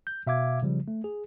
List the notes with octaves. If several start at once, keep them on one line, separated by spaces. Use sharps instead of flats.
G6
B2 E5 F5 D6 G#6
C#3 F3 G3
A3
G#4